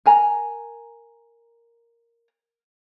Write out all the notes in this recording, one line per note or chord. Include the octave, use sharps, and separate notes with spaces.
A#4 G#5 A#5